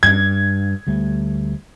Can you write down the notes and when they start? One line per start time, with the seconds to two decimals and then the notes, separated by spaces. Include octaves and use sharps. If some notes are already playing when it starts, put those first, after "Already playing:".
0.03 G2 G#6
0.87 D2 G3 A3